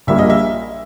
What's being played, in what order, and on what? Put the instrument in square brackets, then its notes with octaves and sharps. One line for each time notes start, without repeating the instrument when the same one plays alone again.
[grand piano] A#1 A#2 G3 A#3 [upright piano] E5
[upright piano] D#5
E5